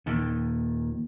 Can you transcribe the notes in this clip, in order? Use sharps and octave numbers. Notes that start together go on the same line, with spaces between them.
D#2 A#2 D#3